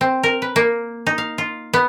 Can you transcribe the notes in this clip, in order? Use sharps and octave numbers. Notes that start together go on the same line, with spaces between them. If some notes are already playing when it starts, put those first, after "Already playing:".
C4
A#4
B4
A#3
D#4
F5
F4
B3